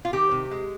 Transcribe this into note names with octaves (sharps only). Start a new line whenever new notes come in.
F4
D#3 G4
C3
G#3